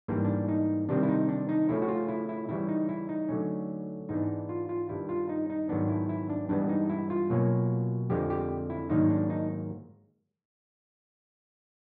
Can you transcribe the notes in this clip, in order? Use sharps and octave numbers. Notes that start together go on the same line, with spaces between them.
G#2 E3 G3 A#3 D4
D4
D#4
C3 D#3 G3 C4 D4
E4
D#4
D4
D#4
C#3 F3 A3 C#4 E4
F#4
F4
E4
E4
C#3 E3 G3 E4
D#4
E4
D#4
D3 F#3 A3 C#4
G#2 E3 G#3 B3 D4 D#4
F4
F4
G2 D#3 G3 E4
F4
D#4
D#4
G#2 D#3 F#3 B3 D4
E4
E4
D4
G2 E3 G#3 B3 D4
D#4
E4
F4
B2 F#3 A#3 C#4
F2 D3 F3 G#3 C4 G4
G4
E4
G#2 D#3 F#3 A#3 D4 D#4
D4
D#4